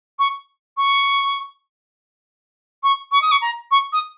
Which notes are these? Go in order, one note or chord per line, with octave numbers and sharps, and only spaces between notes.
C#6
C#6
C#6
C#6
D#6
C#6
A#5
C#6
D#6